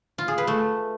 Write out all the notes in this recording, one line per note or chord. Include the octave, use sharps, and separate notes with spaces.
F4
G#4
B4
A3